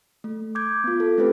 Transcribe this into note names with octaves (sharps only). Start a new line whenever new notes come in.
A3
D6 G6 G#6
B3 F4
A4
A3 C4 C#4 G4 B4